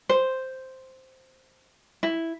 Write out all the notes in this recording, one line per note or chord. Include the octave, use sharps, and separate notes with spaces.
C5
E4